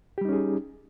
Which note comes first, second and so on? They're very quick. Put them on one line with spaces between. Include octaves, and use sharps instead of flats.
G4 G3 D#4 C#4 G#4